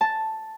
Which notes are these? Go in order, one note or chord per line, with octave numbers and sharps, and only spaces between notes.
A5